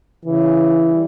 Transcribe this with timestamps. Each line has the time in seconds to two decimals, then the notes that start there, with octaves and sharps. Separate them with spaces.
0.25 C#3 E3
0.89 G3